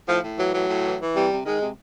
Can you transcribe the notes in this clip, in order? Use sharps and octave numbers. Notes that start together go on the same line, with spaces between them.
A2 F3
A2
E3 F#3
A2 F#3
A2
E3
E3
C3 G3
C3
D#3 G#3
C3